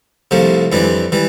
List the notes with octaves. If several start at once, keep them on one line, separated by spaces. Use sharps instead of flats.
C2 C3 F3 A3
F2 E3 G3 D4
E3 G3